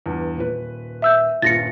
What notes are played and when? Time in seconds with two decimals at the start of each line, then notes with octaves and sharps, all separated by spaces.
0.06 E2 G2
0.38 D#1 B4
1.02 E5 E6 G6
1.42 D#1 G2 F4 A6 A#6 C#7